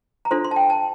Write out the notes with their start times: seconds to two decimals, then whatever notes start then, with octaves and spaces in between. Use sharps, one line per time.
0.25 A#5
0.31 D4 F4 A4 C5 C6
0.44 C6
0.51 A5
0.56 G5
0.70 A5